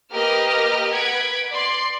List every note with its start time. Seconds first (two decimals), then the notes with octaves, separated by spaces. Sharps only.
0.12 A#3 G4 A#4 B4 D#5 F6
0.91 B4 F#5 G#6 B6 D7
1.53 D5 C6